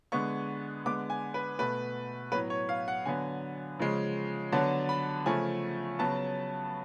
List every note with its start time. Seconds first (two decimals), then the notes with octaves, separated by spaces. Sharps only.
0.12 D3 G#3 B3 C#6
0.85 D3 G#3 B3 D6
1.10 G#5
1.34 B4
1.59 B2 A3 B4
2.32 A2 F#3 B3 B4
2.50 C#5
2.69 F5
2.88 F#5
3.05 D3 F#3 B3 G#5
3.79 C#3 F3 G#3
4.52 D3 F#3 B3 A5
4.89 B5
5.26 C#3 F3 A3 G#5
5.99 C#3 F#3 B3 A5